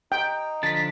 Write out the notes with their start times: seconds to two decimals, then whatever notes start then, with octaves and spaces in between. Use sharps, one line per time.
0.12 D#4 G5
0.63 D3 F3 D4 A6 B6